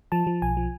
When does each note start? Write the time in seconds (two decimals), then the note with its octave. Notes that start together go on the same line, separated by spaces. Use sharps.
0.12 F3 A5
0.27 F3
0.42 B1 G#5
0.57 F3